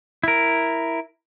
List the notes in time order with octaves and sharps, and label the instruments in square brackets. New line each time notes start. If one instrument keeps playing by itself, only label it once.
[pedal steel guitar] E4 A#4